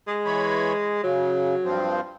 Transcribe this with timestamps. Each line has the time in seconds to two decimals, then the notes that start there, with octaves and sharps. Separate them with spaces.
0.07 G#3
0.25 E3 C#5 B5
1.03 C#3 F#3
1.64 G2 F3 C4